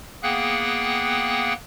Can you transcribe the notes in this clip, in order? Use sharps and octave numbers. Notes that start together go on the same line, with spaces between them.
A#3 B3 G#4 F#5 G5 F#6